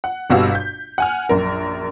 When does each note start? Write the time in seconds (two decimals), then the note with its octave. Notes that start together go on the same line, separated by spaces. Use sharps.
0.04 F#5
0.30 G1 B2 F#4 G4 F5 E6
0.52 G6 B6
0.98 F#5 G#5 F6
1.29 A#1 F#2 A#4